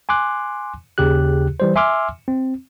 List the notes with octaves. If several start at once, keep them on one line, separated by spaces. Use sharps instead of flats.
G#5 C6 D6 F#6
D#2 C#3 G4 G#4 F#6
E3 G3 C5
E5 G#5 C6 D6 E6 F6
C4